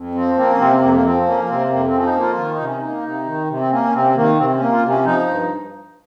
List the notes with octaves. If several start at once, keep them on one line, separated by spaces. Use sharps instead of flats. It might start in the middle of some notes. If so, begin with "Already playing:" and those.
Already playing: F2
F3 C4
A#3 C4
C#4
C3 C4
F2 A#3
A#3
F3 C4
A#3 C#4
C3 C4
F2 A#3
C4
F3 C#4
D#4
A#3 F4
D#3 F4
D#4
C3
C#4
A#3 D#4
C3
D#3
C3
C4
A#3 C#4
C#4
C3 C4
D#3 A#3
C3 C4
C4
C#4
A#3
F4
C3
C#4
F3 D#4
G2